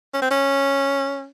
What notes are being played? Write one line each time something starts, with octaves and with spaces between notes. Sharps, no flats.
C#4
C4
C#4